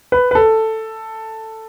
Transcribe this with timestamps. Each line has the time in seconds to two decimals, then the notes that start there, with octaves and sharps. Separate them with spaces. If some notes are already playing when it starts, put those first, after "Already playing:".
0.12 B4
0.31 B4
0.35 A4